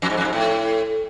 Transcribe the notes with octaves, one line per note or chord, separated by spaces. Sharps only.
F2
G#2
F2
G#2
A2